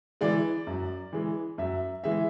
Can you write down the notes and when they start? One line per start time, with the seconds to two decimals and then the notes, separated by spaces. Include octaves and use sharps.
0.21 E3 G#3 D5
0.67 F#2
1.13 E3 G#3
1.58 F#2 E5
2.04 E3 G#3 E5